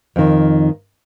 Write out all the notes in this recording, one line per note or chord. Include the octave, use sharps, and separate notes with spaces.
F2 D#3